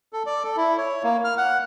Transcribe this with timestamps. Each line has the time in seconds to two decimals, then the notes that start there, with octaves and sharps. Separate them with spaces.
0.13 A4
0.26 D5
0.44 A4
0.57 E4
0.78 C#5
1.03 A#3
1.25 F6
1.37 F#5